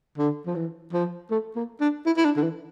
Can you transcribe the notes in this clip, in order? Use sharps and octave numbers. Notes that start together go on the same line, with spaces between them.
D3
F3
E3
F3
A3
A#3
D4
E4
E4
D4
D3
E3